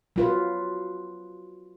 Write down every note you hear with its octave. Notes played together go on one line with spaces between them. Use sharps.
F#3 F4 B4